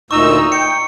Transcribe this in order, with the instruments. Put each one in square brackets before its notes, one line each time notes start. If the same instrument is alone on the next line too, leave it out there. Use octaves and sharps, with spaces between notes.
[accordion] D2 A#2 E6 [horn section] D#4 [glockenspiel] C#6
[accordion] G5 [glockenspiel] C#7